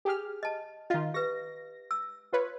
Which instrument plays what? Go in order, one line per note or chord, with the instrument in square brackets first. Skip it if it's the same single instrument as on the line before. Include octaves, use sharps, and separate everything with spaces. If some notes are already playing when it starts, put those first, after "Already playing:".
[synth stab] G4 G#4 F6
[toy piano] D#5 A5
[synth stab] D#3 F4 [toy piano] D#5 F5
[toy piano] G4 B4 [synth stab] A#6
[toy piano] E6
[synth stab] F4 B4 C#5